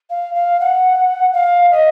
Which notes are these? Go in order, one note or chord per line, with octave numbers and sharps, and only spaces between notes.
F5
F5
F#5
F5
D#5